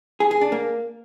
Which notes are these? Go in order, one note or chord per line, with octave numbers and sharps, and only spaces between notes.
G#4
G#4
D4
A#3